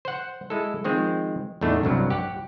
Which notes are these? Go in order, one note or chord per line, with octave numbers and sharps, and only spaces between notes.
C5 F#5
G#3 E4 A4
D#3 F3 G#3 C4
E2 A2 A3 D4 D#4
C2 G2 F#3
G4 F#5